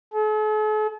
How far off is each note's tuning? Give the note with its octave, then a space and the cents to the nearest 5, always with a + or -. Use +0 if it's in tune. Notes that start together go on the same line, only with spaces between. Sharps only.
A4 -45